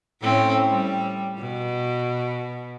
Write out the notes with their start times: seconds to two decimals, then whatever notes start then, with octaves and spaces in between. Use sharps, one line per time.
0.22 A2 C4 C#4
0.69 G3
1.39 B2